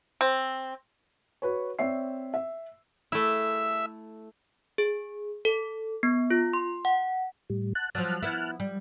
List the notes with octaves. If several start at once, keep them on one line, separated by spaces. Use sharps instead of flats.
C4
F#4 B4 C#5
C4 C#5 D5 E5 C7
E5
A3 E4 E5
G#4
A4
B3
F4
C6
F#5
A2 G3
F#5 A5 F#6
F3 F#3 A5 F6 F#6
B3 E4
G3